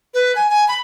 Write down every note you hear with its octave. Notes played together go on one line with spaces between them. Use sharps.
B4
G#5
G#5
B5